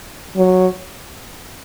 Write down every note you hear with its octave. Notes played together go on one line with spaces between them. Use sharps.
F#3